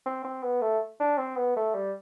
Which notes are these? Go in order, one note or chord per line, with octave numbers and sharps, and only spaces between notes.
C4
C4
B3
A3
D4
C4
B3
A3
G3